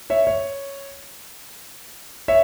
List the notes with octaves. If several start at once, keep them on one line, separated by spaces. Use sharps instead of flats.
C#5 E5
C#5
C#5 E5